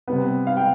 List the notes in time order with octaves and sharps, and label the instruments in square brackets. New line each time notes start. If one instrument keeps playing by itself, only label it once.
[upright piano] C3 G3 B3
F5
G5